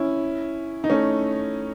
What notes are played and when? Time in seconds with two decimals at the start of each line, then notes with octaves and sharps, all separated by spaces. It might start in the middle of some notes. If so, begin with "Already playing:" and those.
Already playing: C#4 E4
0.84 D#4
0.90 A3 C#4